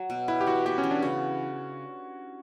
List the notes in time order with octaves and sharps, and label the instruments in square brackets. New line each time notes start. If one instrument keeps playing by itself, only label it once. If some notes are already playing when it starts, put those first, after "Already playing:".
Already playing: [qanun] F#3
B2
[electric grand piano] E4 [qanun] B4
[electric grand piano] G4
[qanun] E3 [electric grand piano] F#4
[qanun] B3 [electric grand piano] G4
[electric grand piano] C#4
[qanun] E3
[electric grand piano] D4
[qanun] C#3 [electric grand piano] F#4